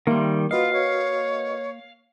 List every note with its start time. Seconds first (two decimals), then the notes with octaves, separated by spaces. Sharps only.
0.07 D#3 G3 A#3 E5 C6
0.51 F4 F#4 B4 D#5 F5
0.73 C#5